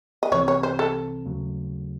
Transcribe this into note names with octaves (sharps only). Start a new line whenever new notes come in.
D#5
C2 C3 E3 C4 C#5
C#5
C5
A4
D#2 C#3 F#3 A3